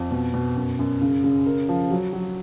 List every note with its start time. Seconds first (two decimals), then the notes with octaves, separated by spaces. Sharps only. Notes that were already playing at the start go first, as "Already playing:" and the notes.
Already playing: F2
0.11 B2
0.34 B2
0.56 F#2
0.79 F#2
1.02 C#3
1.24 C#3
1.46 A#4
1.69 F3
1.91 F#3
2.13 F#3